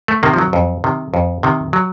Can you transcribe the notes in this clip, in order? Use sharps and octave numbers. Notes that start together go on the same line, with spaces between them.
A3
C3 D#3 A#3
F3
F#3
F2
C3 D#3
F2
C3 D#3
F#3